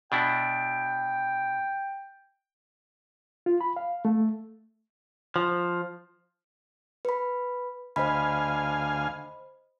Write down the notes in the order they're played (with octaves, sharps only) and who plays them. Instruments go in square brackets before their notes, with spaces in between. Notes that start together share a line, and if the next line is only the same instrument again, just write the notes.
[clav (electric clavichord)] B2 D4 E4 [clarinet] G5
[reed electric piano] F4
B5
F5
A3
[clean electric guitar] F3
[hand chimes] B4 B5
[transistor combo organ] D2 F5 G#5 [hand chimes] C5 D#5 B5